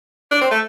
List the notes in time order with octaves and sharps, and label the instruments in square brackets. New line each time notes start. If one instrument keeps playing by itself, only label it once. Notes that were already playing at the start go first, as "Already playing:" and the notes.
[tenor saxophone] D4
C4
A3